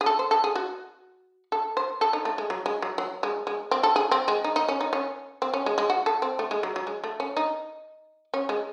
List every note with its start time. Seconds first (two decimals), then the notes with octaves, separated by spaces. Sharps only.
0.01 G#4
0.06 A4
0.19 C5
0.31 A4
0.44 G#4
0.55 F#4
1.52 A4
1.77 C5
2.01 A4
2.13 D#4
2.25 A3
2.38 G#3
2.50 F#3
2.66 G#3
2.82 F#3
2.98 F#3
3.23 G#3
3.47 G#3
3.71 C4
3.83 A4
3.96 G#4
4.11 C4
4.28 G#3
4.44 D#4
4.56 D#4
4.69 C#4
4.81 D#4
4.93 C#4
5.42 C4
5.54 C#4
5.66 G#3
5.78 G#3
5.90 F#4
6.06 A4
6.22 C4
6.39 A3
6.51 G#3
6.63 F#3
6.76 F#3
6.87 G#3
7.04 A3
7.20 C#4
7.37 D#4
8.34 C#4
8.49 G#3